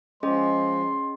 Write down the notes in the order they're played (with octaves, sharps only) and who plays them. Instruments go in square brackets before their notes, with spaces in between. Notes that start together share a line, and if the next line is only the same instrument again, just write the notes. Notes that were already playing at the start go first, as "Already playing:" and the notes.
[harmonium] F3 G#3 [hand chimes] C#4 G#4 D#5 [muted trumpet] C6